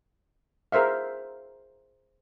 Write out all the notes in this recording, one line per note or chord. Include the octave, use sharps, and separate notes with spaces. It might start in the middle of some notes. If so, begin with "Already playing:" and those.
G#4 A#4 C5 E5 F5